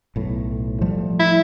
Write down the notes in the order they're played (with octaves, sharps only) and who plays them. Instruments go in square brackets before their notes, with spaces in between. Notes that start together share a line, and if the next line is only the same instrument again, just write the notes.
[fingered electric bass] B1 A2
F3 G3 A3
[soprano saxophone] E4